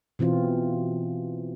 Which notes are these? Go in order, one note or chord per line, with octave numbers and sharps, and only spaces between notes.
B2 E3 C4 F4